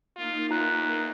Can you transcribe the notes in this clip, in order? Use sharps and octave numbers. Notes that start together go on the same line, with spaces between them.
A#3 D#4 F4
E2 F4 A#5 F#6